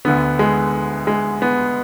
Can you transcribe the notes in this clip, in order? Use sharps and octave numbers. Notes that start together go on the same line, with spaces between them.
D2 D3 B3
G#3
G#3
B3